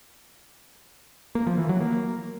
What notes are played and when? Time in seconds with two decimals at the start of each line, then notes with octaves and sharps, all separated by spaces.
1.35 A#3
1.47 F3
1.58 E3
1.69 F#3
1.80 A#3